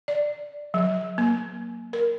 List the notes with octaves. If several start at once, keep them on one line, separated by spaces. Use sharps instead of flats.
D5
F#3
A#3
A#4